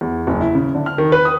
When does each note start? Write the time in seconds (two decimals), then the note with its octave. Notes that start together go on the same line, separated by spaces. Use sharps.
0.01 E2
0.27 F#1
0.41 E4
0.55 C#3
0.75 D3
0.86 F6
0.98 D#3
1.12 B4
1.25 D#6